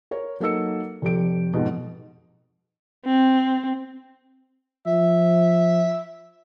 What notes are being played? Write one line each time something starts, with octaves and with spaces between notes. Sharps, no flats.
A#4 C#5
F#3 A#3 D#4 A4 E6 C#7
F1 F2 G4 D7
F2 G#2 B2
C4
F3 E5